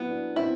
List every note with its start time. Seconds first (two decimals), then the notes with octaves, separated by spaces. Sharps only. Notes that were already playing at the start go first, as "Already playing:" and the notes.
Already playing: F#3 B3 E4
0.09 D4
0.36 C4 E4